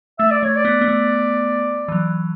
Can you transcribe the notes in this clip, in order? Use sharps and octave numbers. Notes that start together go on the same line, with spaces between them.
A3 E5
D5
A3 C#5
D5
B3
B3
A3
E3
F#3